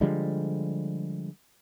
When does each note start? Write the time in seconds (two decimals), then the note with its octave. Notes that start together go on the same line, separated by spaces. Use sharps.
0.01 D3 F3 G3 G#3